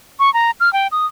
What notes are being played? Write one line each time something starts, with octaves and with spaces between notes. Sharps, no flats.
C#6
A#5
F6
G5
D#6